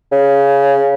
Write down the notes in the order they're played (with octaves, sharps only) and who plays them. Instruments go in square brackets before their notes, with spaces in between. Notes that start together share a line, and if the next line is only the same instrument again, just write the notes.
[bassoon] C#3